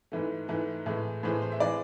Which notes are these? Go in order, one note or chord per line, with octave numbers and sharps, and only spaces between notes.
G#2 E3 A3
G#2 E3 A3
A2 E3 G#3
A2 E3 G#3 C5
C5
E5
E3 G#3 D5